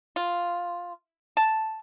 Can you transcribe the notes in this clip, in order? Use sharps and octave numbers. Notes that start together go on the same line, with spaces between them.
F4
A5